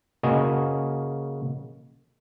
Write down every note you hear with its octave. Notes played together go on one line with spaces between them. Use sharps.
C#3 A#3 F#4 D#5 G#5